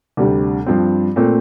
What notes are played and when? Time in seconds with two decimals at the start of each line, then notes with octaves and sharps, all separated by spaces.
0.17 D2 C3 G3 D4
0.66 G2 F3 C4
1.16 A#2 A3 C4